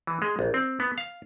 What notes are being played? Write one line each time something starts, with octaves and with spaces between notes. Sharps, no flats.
E3
G#3
A#1
C4
B3
F5